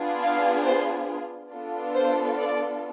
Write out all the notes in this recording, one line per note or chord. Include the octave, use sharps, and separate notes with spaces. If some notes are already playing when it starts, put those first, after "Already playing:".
Already playing: B3 D4 F4 G#4
F5
C5
B3 D4 F4 A4
C5
D5